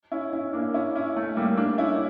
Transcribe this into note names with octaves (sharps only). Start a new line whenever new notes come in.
C#4 E4
C#4 E4
A#3 D4
C#4 E4
C#4 E4
A3
G3 A#3
A#3 D4
C#4 E4